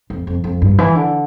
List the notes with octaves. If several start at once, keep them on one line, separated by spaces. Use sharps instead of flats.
F2
F2
F2
G2
E3
D3